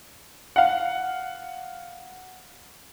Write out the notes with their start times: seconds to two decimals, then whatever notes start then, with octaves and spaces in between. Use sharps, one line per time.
0.56 F5 F#5